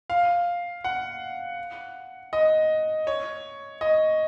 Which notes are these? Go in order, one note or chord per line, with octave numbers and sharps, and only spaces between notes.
F5
F#5
D#5
C#5
D#5